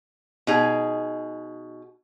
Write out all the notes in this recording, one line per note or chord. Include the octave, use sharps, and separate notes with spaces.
B2 D#4 G#4